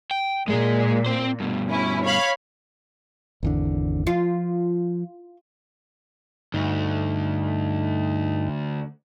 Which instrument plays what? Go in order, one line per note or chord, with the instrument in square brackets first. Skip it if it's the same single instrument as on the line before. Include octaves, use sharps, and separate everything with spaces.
[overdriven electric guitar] G5
[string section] A#2 [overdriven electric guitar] G#3 G#4
[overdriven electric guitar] C4 C5
G2 B2
[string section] C#4 E4
C#5 F5 B5
[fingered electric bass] G#1 E2 D3
[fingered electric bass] F3 [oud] F4
[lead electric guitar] D2 [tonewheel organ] G2 D#4